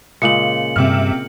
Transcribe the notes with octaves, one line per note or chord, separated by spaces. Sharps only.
A#2 C#3 G#3 C#7 F#7
G2 C3 E5 F6